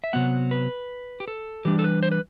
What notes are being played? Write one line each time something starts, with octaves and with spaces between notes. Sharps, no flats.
E5
C3 F#3 B3 F#5
B4
G4
A4
E3 G3 D4 G4
A4
B4
C5
B4